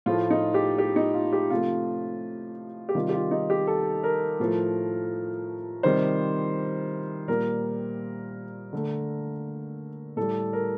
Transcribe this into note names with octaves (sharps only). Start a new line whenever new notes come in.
A2 F3 A3 F4
D#4
G4
G4
D#4
F4
G4
C3 F3 A3 F4
G4
C3 D#3 G3 F4
G4
F4
D#4
G4
A4
A#4
A2 F3 A3
C3 D#3 G3 C5
A#2 G3 A#4
D3 A3
A2 G3 A4
A#4